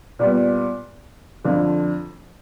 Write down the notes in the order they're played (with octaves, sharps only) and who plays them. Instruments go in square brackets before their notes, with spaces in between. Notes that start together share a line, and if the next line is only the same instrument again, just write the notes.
[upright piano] A#2 G3 B3
F2 D3 F3